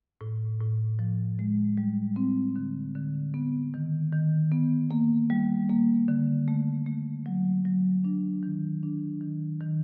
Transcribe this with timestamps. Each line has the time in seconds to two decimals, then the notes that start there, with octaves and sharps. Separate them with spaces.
0.21 A2
0.61 A2
0.99 F3
1.39 G#3
1.78 G3
2.16 C4
2.56 D3
2.95 D3
3.34 B3
3.74 D#3
4.12 D#3
4.52 B3
4.91 A#3
5.30 G3
5.69 A#3
6.08 D3
6.48 A3
6.86 A3
7.26 F#3
7.65 F#3
8.04 D4
8.43 D#3
8.83 D4
9.21 D#3
9.61 D#3